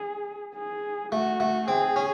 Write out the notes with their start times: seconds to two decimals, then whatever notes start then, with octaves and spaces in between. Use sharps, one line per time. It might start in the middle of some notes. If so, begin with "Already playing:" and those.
Already playing: G#4
0.56 G#4
1.12 A3 F#4
1.40 A3
1.68 C4 G#4
1.96 C#4